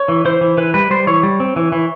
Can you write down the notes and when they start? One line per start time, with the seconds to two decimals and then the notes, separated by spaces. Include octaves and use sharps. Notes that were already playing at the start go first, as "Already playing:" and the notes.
Already playing: C#5
0.08 E3
0.25 E3 C5
0.41 E3
0.57 E3 B4
0.74 G3 B4
0.91 G3 C5
1.07 E3 C#5
1.23 G3
1.40 C4
1.56 E3
1.72 E3